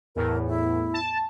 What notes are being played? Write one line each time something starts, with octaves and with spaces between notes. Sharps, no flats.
E2 A2 A#4
E4
A5